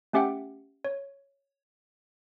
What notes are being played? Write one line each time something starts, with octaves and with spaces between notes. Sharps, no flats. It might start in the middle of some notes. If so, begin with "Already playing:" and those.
A3 C#4 G4 E5 F#5 G5
C#5